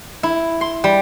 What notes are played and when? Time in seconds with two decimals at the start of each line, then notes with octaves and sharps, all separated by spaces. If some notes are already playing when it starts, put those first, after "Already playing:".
0.23 E4
0.61 C6
0.84 G3